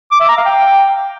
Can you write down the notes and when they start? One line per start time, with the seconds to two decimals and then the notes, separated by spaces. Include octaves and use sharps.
0.12 D6
0.20 E5
0.28 A#5
0.37 F5
0.45 G5